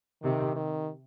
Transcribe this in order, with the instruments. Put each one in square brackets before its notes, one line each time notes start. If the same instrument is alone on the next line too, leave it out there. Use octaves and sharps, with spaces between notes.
[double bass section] C3 [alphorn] D#3
[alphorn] D#3